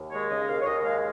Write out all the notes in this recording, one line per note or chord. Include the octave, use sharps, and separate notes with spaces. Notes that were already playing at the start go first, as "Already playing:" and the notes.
Already playing: D#2
G#3 C#5
C#3 D#5
D#2 F5
C#5
D#2 D#5
D#5
G#3 F5